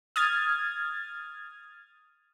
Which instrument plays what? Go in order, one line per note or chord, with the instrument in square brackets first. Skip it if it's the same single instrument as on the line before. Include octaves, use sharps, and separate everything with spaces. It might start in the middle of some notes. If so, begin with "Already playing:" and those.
[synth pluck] D#6 F6 G#6 A6